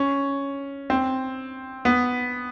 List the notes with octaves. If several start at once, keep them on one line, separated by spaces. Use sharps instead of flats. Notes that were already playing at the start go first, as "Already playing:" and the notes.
Already playing: C#4
C4
B3